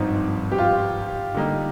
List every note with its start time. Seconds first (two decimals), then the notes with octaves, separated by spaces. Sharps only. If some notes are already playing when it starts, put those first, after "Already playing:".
Already playing: G#1 G2 F3 C4 D#4
0.52 G4
0.58 F4
1.34 D3 G3 A#3 D#4